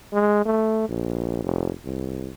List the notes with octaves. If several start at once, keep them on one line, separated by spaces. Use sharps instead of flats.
G#3
A3
A#1
F1
C2